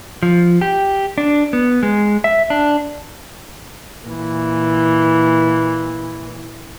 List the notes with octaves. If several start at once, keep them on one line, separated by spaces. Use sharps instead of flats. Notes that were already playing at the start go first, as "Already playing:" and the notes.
F3
G4
D4
B3
G#3
E5
D4
A#2 E3